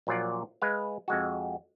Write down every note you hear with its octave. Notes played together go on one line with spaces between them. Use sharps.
A#1 A#2 F#3 F4 D5
G#3 B4 F5
F2 G#3 F#4